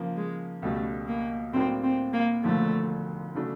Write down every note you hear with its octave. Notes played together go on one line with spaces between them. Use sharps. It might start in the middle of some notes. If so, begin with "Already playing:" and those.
Already playing: C#3 F3 A#3
G#3
C#2 B2 G3 A3
A#3
A2 F#3 A#3 C4 D4
C4
A#3
E1 D#2 D3 F3 A3
C#3 F#3 A3 D4